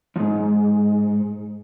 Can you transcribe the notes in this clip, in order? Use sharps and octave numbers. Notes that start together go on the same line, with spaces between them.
F2 G#2